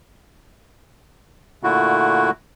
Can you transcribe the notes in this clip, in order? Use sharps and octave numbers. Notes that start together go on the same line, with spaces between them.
A#2 D3 A3 E4 F#4